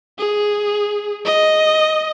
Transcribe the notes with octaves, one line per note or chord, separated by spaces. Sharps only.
G#4
D#5